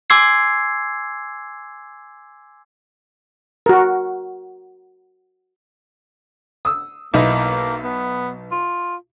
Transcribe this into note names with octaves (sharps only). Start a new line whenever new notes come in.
G#5 C6 D6 E6 G#6 C7
F#4 A#4
D#6 E6
B1 A#3 D#4 E4
B3
F4